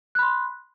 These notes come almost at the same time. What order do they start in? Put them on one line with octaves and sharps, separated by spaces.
F#6 B5 C6